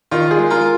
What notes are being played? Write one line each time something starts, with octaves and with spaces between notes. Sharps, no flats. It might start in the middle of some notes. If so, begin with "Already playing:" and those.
D#3 F4
G#4
G#3
F4 A#4